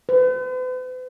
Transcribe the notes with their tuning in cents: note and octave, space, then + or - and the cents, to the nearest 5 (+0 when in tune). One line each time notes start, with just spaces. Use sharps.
B4 +45